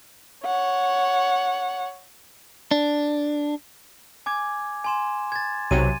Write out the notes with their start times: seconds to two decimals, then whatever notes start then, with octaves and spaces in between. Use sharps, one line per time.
0.45 C#5 F#5
2.71 D4
4.26 G#5 D6 G#6
4.84 G#5 C6 E7
5.32 G#6 A6
5.71 B1 C3 F#3 D#7